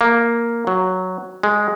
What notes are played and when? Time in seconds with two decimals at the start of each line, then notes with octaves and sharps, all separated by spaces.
0.01 A#3
0.67 F#3
1.43 G#3